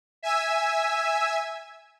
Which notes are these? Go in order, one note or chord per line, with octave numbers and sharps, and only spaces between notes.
E5 G#5 E6